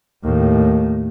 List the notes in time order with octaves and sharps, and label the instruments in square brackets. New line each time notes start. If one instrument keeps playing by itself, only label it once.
[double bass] D#2 A2